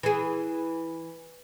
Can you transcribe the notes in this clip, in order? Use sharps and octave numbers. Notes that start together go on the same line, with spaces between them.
E3 G#4